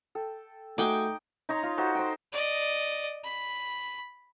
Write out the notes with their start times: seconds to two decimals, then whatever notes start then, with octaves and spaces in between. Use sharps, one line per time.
0.15 A4 G5
0.78 A3 D#4 F#4 G#4 G5 D6 D#6
1.49 D#4 C#5 A#5 C6
1.63 F4
1.77 D#4 F#4 A4 C5
1.95 C5 G5
2.33 D5 D#5
3.24 B5